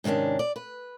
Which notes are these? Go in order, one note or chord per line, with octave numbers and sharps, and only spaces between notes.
G#2 C3 D#3 C#4 D4
D5
B4